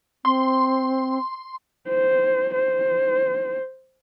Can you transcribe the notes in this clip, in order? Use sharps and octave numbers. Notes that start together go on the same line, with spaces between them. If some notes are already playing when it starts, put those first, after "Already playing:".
C4 C6
C5
C5